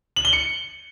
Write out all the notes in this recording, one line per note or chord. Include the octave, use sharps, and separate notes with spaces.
F#7
G7
C#7